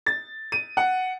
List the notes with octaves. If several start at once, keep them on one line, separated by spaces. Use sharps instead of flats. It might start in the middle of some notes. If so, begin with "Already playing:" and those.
A6
D#7
F#5